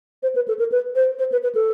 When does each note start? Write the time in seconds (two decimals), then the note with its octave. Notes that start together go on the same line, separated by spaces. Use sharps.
0.23 C5
0.35 B4
0.48 A4
0.59 A#4
0.72 B4
0.95 C5
1.19 C5
1.32 B4
1.43 B4
1.55 A4